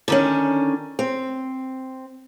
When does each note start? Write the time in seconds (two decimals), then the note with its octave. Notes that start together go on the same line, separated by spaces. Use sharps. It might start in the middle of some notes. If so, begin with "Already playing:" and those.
0.08 D3 D#3 C#4
0.99 C4